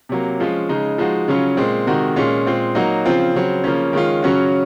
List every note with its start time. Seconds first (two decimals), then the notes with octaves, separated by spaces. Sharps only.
0.09 C3 F#3 A#3
0.40 F3 G#3 C#4 F4
0.69 C#3 G#3 D#4
0.98 F3 G#3 D#4 F#4
1.28 C#3 F#3 C#4 F4
1.57 A#2 G#3 C4
1.87 C3 D#3 G#3 D#4 F#4
2.16 A#2 G#3 C#4 F4
2.47 A#2 G#3 C4 F4
2.75 F#3 A#3 D#4 F#4
3.05 C#3 F3 C4 F4
3.35 C#3 F#3 C4
3.64 C#3 F3 A#3 C#4
3.93 D#3 G#3 C#4 F4
4.23 C#3 F#3 C#4 F#4